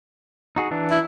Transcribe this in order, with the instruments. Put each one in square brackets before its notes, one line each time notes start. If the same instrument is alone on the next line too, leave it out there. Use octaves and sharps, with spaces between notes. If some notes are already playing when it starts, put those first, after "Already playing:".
[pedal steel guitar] D#4 F#4 G#4
E3 D4
[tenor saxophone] E4